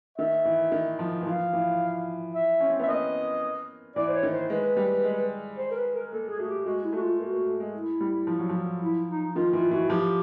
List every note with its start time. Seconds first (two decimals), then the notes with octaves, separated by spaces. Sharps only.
0.18 D#3 E5
0.45 E3
0.72 D#3
0.99 F3
1.22 E3
1.26 F3 F5
1.53 E3
2.35 E5
2.60 C#4
2.70 C4
2.79 B3 E5
2.88 A#3 D#5
3.96 E3 D5
4.08 C5
4.14 C#5
4.23 D#3
4.32 C5
4.50 G#3 B4
4.77 G3
5.04 G#3
5.58 C5
5.71 A#4
5.76 B4
5.94 A#4
6.12 A#3 A4
6.30 G#4
6.39 A3 F#4
6.48 G4
6.66 G#3 F#4
6.84 E4
6.92 A3 F#4
7.01 F4
7.19 A#3 F#4
7.33 A#3
7.47 A3
7.60 G#3
7.74 E4
8.01 G3
8.27 F3
8.39 F#3
8.49 F3
8.82 E4
9.08 D#4
9.35 D#3 F4
9.53 E3 F4
9.71 E3 F#4
9.89 F3 G4